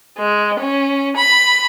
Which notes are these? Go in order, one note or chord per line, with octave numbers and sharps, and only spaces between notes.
G#3
C#4
B5